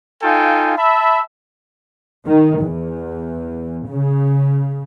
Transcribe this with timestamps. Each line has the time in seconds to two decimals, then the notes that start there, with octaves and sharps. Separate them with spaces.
0.23 D#4 F4 A4 F5 G5 G#5
0.77 E5 A5 B5
2.27 D#3
2.62 E2
3.88 C#3